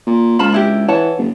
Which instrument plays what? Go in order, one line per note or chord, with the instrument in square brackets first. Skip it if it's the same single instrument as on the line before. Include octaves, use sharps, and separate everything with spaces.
[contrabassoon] A#2
[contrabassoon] C#2 [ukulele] F4 A5 B5
[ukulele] D4 E4 G4
[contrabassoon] E3 [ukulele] C#5 F#5 A5
[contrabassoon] F#1